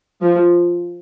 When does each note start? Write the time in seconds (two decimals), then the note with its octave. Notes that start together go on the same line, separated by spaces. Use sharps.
0.22 F3